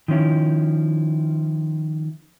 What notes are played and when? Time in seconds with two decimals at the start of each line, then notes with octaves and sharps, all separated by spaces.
0.08 D#3 F3 C#4 E4